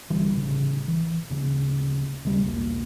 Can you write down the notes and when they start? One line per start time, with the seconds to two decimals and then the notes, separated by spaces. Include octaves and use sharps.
0.10 G1 D3 E3 G3
0.33 A1 C#3
0.88 E3
1.30 D1 C#3
2.24 D#2 C#3 G3 G#3
2.41 B1 E2 A#3